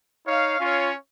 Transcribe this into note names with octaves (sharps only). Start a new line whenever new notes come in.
D#4 C#5 F5
C#4 F4 C#5 F5